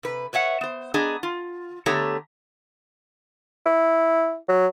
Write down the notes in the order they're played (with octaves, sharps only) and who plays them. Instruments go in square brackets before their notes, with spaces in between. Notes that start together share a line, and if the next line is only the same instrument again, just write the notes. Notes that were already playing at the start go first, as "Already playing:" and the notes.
[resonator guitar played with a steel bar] C3 B4
B4 C#5 E5 F#5
B3 C5
B3 D4 G#4 D#5 A#5
F4
D3 A3 B3 G4 C#5 A#5
[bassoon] E4
F#3